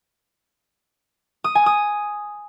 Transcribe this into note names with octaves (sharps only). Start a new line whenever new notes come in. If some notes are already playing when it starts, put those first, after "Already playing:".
D#6
G#5
D#6